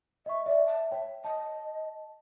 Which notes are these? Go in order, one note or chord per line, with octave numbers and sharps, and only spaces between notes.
D#5 E5 C#6
D5 E5
A5
C#5 E5 G5
D#5 A5